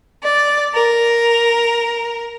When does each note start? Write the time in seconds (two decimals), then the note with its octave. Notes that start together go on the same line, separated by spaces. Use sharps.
0.24 D5
0.75 A#4